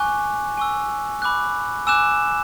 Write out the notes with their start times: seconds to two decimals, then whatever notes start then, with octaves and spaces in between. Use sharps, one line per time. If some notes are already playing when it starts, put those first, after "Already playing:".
Already playing: G#5 C#6 D6 F#6
0.57 G#5 C#6 E6
1.22 B5 D6 F#6
1.87 G#5 D6 E6 F#6 E7